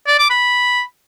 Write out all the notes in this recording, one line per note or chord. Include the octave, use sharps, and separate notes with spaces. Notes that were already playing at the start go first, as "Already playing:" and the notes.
D5
D6
B5